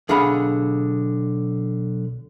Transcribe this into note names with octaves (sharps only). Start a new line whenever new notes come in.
B1 D3 G#4 F5 F#5 B5